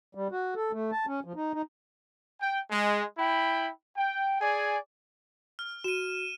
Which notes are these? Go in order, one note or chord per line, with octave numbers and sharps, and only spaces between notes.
G3
F#4
A4
A3
A5
C#4
F3
D#4
D#4
G5
G#3
E4 G5 B5
G5
G#4 D5 G#5
F6
F#4 D#7 E7